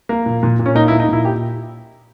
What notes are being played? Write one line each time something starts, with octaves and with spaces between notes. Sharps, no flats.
A#3
A#2
A#2
A#2
C#4
A#3 D#4
E4
A#3
D#4
A#2 E4
G4